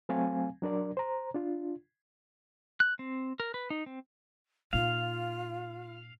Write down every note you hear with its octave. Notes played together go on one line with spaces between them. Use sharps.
F#3 A3 C4 F5 G#5
F#3 D4 A#4 D5
C5 A#5
D4 F4
F#6
C4
A#4
B4
D#4
C4
A#2 D#4 F4 F5